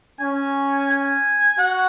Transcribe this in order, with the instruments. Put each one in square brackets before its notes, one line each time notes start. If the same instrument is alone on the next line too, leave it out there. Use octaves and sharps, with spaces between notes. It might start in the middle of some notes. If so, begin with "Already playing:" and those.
[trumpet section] C#4 [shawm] G#5
[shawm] G#5
[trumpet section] F#4 [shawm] F#5